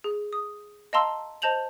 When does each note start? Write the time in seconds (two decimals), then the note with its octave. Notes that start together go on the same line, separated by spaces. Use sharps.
0.04 G#4
0.33 D#6
0.93 D#5 F5 A5 A#5 C6 E6
1.42 C5 D#5 A5 G6 F7 F#7